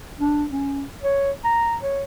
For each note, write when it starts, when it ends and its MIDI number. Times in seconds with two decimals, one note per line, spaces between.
0.20 0.45 62
0.50 0.84 61
1.03 1.31 73
1.44 1.77 82
1.83 2.03 73